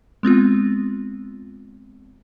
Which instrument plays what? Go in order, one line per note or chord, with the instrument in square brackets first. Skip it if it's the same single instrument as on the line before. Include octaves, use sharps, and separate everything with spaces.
[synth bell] G#3 B3 C4 F4